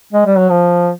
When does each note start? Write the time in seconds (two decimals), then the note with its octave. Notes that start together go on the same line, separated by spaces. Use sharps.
0.13 G#3
0.26 G3
0.37 F#3
0.49 F3